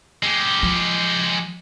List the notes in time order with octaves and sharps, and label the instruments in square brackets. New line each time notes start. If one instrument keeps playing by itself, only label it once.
[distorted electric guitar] G#3 G4
[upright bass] F3